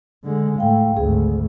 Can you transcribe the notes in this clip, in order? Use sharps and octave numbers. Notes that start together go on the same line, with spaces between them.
D3 G#3
A2 F5 G5
G#1 D2 G#4